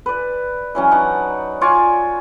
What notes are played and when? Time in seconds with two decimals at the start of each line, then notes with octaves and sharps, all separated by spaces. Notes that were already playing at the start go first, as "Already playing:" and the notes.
0.06 B4 D5
0.75 E3 F#3 C#4
0.91 D#4 D5 F#5 A5
1.61 F4 C#5 D5 G#5